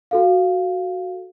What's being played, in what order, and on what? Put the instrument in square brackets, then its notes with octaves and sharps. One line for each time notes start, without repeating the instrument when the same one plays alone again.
[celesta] F#4 A4 F5